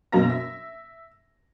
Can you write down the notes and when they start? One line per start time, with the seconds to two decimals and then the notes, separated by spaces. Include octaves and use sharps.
0.12 F#2 B2 A#3 A#5 A#6
0.30 E5